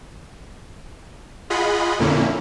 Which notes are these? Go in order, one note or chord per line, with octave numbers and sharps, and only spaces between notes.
F4 G#4 D#5 F#5 B5
F2 A#2 D3 A#3 C#4 E4